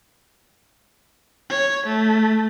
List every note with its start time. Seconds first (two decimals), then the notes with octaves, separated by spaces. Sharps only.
1.50 C#5
1.86 A3